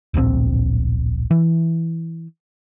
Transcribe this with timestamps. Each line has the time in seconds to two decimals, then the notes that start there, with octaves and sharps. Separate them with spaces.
0.14 D1 A#1 B2 C4
1.31 E3